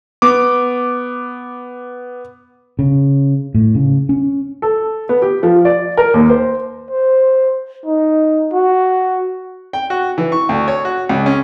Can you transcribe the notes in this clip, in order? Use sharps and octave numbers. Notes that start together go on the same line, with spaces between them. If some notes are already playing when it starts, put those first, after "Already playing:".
B3 D6
C#3
A2
C#3
C#4
A4
B3
G4
F3
D5
A#4
D#2
C5
C5
D#4
F#4
G5
F#4
E3
C#6
D2
C#5
F#4
C#2
C#4